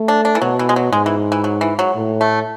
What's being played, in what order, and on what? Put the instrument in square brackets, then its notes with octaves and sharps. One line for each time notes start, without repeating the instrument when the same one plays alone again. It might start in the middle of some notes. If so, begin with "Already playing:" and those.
Already playing: [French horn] A3
[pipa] D4
D4
E3
[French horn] B2 [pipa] F#3
[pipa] E3
G#3
F#3
[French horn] G#2 [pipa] G#3
[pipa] E3
E3
F#3
E3
F#3
[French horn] A2
[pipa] A3